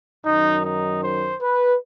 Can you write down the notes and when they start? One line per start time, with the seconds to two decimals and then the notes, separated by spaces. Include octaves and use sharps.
0.25 F#2 D#3 F#3 D#4
0.63 D#4
1.01 C5
1.40 B4